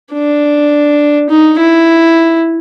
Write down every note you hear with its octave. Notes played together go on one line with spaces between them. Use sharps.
D4
D#4
E4